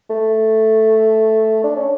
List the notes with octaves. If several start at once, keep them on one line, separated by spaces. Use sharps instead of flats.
A3
D4
C#4